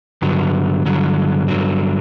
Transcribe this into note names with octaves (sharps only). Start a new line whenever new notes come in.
G2 D3 F#3
G2 D3 F#3
G2 D3 F#3